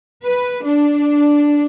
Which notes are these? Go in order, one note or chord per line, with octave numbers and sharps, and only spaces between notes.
B4
D4